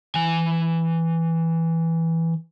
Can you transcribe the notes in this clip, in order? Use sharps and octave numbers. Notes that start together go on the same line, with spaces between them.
E3 G#5